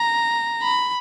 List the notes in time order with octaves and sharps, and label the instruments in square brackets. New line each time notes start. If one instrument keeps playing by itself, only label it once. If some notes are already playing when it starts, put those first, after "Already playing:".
Already playing: [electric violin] A#5
B5